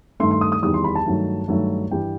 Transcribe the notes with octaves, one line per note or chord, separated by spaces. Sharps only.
G2 D#3 A3 C6
C6
D#6
D#6
E2 D#3 G3 D#6
C6
B5
A5
G2 D#3 F#3 A3
G2 D#3 F#3 A3
G2 E3 G3 G5